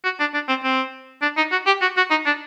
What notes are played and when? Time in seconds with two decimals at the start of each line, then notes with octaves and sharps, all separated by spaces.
0.04 F#4
0.20 D4
0.34 D4
0.49 C4
0.63 C4
1.22 D4
1.37 D#4
1.52 F#4
1.66 G4
1.81 F#4
1.97 F#4
2.10 D#4
2.26 D4